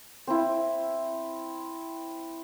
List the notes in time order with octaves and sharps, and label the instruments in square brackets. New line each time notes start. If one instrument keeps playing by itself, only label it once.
[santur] C4 E4